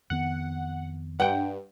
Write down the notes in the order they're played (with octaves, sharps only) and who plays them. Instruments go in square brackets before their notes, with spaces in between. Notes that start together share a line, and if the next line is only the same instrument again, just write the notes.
[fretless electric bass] F2 D#3 B3 [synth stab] F#5
[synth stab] G2 [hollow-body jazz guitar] F#5 G5